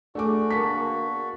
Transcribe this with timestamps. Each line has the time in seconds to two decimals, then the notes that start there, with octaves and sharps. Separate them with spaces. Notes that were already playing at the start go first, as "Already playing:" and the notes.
0.15 A3 D4 F#4 G#4 D6
0.50 B2 D3 A#3 A5 C#6 B6